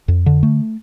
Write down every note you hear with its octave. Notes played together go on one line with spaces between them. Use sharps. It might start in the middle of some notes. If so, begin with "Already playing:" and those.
F2
D3
A3